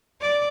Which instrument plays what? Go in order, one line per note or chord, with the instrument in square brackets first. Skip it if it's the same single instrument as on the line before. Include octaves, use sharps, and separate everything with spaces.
[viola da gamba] D5